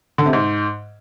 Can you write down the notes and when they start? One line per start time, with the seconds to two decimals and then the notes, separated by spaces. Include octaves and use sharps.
0.18 D3
0.26 C3
0.33 G#2